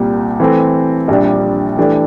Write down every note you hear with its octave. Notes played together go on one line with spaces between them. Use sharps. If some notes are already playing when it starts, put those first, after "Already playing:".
Already playing: C2 A#2 G3
E3 A3 C4
A#1 A#2 G3 D4
E3 A3 D4 G4